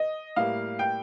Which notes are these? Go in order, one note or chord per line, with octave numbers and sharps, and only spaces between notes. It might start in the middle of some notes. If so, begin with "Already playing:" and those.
Already playing: D#5
A2 G3 A#3 F5
G5